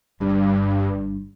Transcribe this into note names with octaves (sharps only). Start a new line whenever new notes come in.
G1 G2 G3 D4